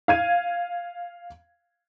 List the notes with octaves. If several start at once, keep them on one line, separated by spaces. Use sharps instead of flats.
F5 G#6 D#7